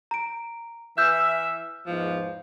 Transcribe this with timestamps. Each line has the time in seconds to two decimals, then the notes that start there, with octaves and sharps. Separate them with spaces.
0.11 A#5 D7
0.98 E3 E5 E6 F6 G6
1.87 E2 G#2 F3